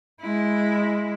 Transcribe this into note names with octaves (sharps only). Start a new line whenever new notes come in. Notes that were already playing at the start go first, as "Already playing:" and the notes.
G#3 E4